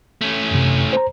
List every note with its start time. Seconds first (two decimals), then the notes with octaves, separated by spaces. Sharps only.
0.21 A3 C#4
0.51 F#2 C3
0.93 C5 A#5